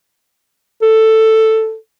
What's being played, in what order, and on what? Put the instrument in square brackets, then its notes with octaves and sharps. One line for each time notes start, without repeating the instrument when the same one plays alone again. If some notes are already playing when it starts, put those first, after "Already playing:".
[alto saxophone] A4